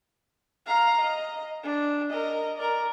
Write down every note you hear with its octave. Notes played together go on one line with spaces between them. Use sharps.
F5 A#5
D#5
D4
A#4 D#5
A#4 D5